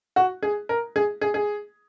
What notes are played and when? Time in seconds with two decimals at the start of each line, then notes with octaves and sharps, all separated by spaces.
0.16 F#4
0.43 G#4
0.69 A#4
0.96 G#4
1.21 G#4
1.34 G#4